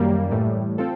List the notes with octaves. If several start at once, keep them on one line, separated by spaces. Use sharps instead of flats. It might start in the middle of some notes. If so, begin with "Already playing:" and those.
Already playing: F#2 D#3 G3 A#3
A2 E3 G3
C4 F4 A4